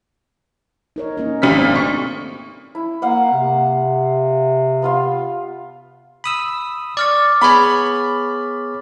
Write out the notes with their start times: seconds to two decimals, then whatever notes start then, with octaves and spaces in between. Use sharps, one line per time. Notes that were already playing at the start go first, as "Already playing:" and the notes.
0.96 D#4 A#4 C#5
1.17 A#3 C#4 D#4
1.42 G#1 F6 B6
1.60 A3 C4 D4
1.75 C#6
2.75 E4
3.02 A#3 F5 F#5
3.33 C3
4.82 B3 F4 F5
6.24 B5 D#6 E6
6.97 D5 C#6 D6 F6 A6
7.41 B3 G#4 C#5 B5